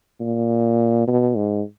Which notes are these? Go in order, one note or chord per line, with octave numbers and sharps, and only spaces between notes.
A#2
B2
G#2